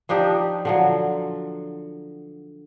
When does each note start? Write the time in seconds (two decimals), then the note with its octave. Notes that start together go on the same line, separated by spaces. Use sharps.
0.09 F3 D4 D#4 G4
0.65 D3 F3 F#3